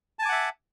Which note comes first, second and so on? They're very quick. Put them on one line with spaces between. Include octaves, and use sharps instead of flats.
A5 G#5 D6 F#5 E5